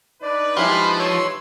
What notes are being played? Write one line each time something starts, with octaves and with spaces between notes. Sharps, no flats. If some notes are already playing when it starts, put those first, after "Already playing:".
D4 D#4 B4 D5
F3 G#3 E4 G4 B5 F6
C#5 C6 E6